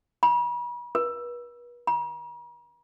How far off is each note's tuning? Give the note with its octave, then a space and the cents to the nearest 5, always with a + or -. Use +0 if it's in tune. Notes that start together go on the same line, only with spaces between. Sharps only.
B5 -40
B4 -40
A#5 +45